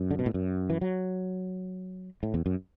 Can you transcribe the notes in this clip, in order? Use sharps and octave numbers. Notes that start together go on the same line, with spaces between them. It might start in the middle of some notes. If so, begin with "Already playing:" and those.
Already playing: F#2
D3
B2
A2
F#2
E3
F#3
A2
E2
F#2